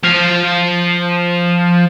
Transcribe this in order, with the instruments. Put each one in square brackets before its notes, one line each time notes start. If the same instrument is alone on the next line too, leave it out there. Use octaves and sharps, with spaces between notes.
[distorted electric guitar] F3 F5